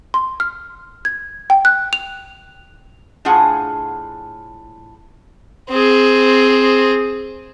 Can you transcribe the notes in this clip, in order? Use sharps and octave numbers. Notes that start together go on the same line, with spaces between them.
C6
F6
G#6
G5
F#6
F7
A2 D4 F4 G#4 F#5 G#5
C4 G#4